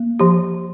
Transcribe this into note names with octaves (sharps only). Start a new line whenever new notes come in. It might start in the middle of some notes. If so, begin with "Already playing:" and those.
Already playing: A#3
F3 G4